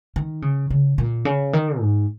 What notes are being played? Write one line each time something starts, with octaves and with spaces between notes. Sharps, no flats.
D#3
C#3
C#3
A#2
C#3
D#3
G#2